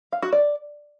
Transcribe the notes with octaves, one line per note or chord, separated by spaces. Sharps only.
F5
F#4
D5